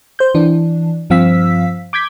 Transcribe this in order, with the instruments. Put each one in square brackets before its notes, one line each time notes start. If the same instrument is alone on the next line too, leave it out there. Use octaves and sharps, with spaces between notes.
[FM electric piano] C5 G6
E3 D4
G2 F3 C4 F5 E6 B6
D6 G6 G#6 B6